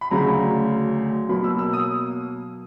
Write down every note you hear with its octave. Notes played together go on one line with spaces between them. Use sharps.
B5
D2 C#3 F#3 A#5
B2 F#3 A#3 B5
E6
E6
D#6